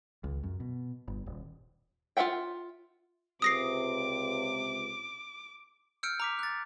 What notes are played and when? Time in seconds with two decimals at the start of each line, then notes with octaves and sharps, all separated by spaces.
0.24 C#2
0.43 F#2
0.60 B2
1.08 G1
1.26 D#1
2.17 F4 A#4 E5 F#5 G5
3.42 C#2 C3 D6 D#6 A#6 C7
6.03 E6 F6 G6 C#7 D7
6.20 A#5 D6 B6
6.39 F#6 A6